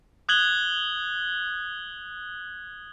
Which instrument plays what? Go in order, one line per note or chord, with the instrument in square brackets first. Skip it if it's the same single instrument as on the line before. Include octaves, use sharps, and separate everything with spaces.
[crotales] D#6 F#6 G#6 F#7 G7